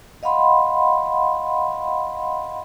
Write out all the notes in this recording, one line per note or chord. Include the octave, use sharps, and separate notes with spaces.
D#5 F5 F#5 B5 C6